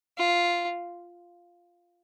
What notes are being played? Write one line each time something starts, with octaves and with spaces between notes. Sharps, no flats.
F4